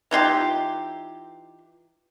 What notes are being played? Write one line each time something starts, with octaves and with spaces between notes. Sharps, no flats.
E3 D#4 F4 G4